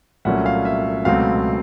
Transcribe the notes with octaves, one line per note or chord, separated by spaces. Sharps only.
C2 A#2 F#3 A3 C#4 E5 F#5
F5
E5
C#2 B2 F#3 A3 C4 F5